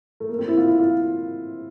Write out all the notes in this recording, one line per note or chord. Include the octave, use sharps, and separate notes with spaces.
A3
A#3
C4
E4
F4
E4
F4